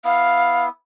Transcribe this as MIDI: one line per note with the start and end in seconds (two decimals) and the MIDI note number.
0.05 0.69 59
0.05 0.69 64
0.05 0.65 77